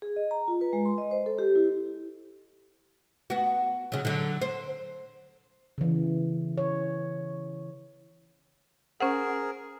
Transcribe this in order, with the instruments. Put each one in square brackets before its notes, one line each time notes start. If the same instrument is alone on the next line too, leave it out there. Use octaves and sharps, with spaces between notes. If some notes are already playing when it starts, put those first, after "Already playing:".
[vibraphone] G#4
D#5
A#5
F4
B4
G#3
C6
D#5
C5
A4
G4
E4
[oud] B3 F#4
C#3 F#3
D3 F#3
C5
[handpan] C#3 E3
C#5
[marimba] C#4 C5 F#5 [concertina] G#4 A#4